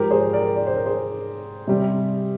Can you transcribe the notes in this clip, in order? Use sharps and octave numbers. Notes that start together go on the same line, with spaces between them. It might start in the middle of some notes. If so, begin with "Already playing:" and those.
Already playing: G#2 F3 G#3 G4 A#4
G#4 C5
A#4 D5
D5
C5
A#4
G#4 C5
C3 G3